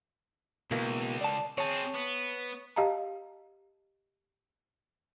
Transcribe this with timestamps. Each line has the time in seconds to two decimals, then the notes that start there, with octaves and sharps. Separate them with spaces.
0.71 C#2 B2 E3 A#3
1.21 D5 A5
1.58 C4 G#4 C#5 A5
1.95 B3
2.76 G4 D#5 F5 A5 A#5